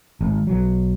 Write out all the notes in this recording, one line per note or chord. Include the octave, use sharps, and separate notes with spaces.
G#1
B1 F#3